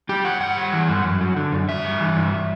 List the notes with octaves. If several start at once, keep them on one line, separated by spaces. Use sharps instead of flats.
G3 G4
G3 F#5
G2 F#5
G3
E3
G2
F#2
F#3
D3
F#2
G2 E5
G3
E3
G2